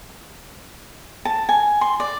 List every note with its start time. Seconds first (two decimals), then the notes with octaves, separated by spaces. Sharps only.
1.25 A5
1.49 G#5
1.81 C6
2.00 D5